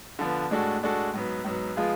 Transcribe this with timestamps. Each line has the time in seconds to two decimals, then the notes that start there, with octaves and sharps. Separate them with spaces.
0.19 D3 F3 B3
0.51 A2 G#3 D4 F#4 A4
0.82 A2 G#3 D4 F#4 A4
1.13 G#2 F#3 B3
1.44 G#2 F#3 B3
1.76 F3 G#3 B3 F4 G#4